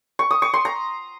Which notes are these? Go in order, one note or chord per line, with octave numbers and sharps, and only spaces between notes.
C#6
D#6
C#6
C6
A#5